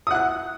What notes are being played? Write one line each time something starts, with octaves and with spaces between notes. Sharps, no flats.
F#5 D#6 F#6